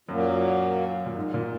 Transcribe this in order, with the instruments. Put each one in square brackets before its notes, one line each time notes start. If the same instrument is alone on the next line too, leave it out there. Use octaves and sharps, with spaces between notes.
[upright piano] F#2 [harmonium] A#2 F#3 A#3
[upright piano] A#2
G#2
A#2